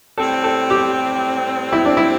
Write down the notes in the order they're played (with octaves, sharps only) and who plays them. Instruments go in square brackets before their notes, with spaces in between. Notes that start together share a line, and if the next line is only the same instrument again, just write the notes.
[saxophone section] A2 G3 C4 [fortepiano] A4
[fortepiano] A4
G4
E4
D4
E4